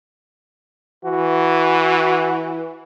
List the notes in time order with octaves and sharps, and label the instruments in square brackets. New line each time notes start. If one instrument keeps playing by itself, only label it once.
[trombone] E3 [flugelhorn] F#4